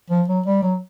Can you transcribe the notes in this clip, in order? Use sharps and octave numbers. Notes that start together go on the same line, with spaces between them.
F3
F#3
G3
F#3